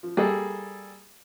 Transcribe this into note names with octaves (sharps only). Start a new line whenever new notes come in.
F3
G3 A#3 G#4 A4